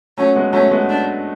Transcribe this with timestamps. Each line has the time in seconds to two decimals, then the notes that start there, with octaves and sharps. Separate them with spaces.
0.18 F#3 A3 C#4
0.35 G#3 B3
0.53 F#3 A3 C#4
0.71 G#3 B3
0.89 D4